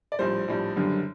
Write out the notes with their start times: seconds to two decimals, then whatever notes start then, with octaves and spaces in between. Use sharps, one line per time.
0.12 D5
0.19 A#1 A2 G3 C5
0.48 A#1 A2 G3
0.76 F#1 F#2 D3 G3